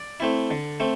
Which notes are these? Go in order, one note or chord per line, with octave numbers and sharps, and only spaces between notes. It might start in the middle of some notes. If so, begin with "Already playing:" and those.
Already playing: D5
A3 C4 E4
D3
A3 C4